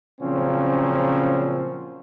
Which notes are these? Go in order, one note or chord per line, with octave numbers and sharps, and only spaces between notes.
A#2 C#3 F3 F#3 C4 C#4